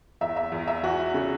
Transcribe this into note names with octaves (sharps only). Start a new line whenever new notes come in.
E2 E5
E5
E2
E5
E3 F#4
C#3